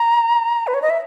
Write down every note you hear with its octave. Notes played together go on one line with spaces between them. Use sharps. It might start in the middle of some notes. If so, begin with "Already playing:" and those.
Already playing: A#5
B4
C#5
D#5
E5